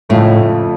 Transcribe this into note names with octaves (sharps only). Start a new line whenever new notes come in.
F2 A2 C#3 F3 A3